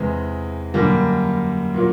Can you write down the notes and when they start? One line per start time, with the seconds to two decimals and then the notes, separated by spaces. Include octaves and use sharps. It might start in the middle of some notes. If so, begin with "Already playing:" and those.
Already playing: E2 C3 E3 G#3
0.74 F#2 D3 G3 A#3
1.74 A#2 F#3 A#3